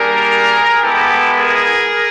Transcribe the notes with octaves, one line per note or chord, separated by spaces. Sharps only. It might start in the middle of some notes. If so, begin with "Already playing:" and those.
Already playing: G3 A#3 D4 G#4 A#4
G#3 B3 E4 G4 A4
G#4 A#4